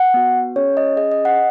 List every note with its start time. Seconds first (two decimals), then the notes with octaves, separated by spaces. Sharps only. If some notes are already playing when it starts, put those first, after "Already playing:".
Already playing: F#5
0.14 B3 F#4
0.56 C#4 G#4 C#5
0.77 D#5
0.97 C#4 G#4 D#5
1.12 D#5
1.25 F#5